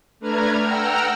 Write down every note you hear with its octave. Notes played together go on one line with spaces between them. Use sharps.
A3 D4 B4 A#5 F6 G#6
F#5 G5 A#5 E6 F6